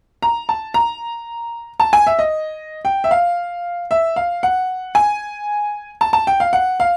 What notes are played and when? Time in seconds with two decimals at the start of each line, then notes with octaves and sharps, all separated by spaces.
0.22 A#5
0.49 A5
0.74 A#5
1.80 A5
1.93 G#5
2.07 E5
2.19 D#5
2.85 G5
3.04 E5
3.11 F5
3.91 E5
4.16 F5
4.43 F#5
4.95 G#5
6.01 A5
6.13 A5
6.27 G5
6.40 F5
6.53 F#5
6.80 F5